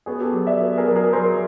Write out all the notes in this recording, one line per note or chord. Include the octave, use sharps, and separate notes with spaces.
B3 F#4 G#4
G4 A4
F#3
D5 E5
B3
G#4 A#4
F#3
G#4 A#4
F#3 A#4 C5